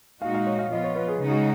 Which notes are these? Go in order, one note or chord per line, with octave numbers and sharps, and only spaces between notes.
A#2 G#3 D#4 F#4 F5
F5
C#5
F5
F3 B3 F4 D#5
C#5
B4
G#4
C#3 G#3 D#4 F#4 G#4